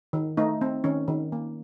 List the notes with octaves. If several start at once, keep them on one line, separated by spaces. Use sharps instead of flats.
D#3
A3 D#4
C4
D#3 C#4
D#3
A#3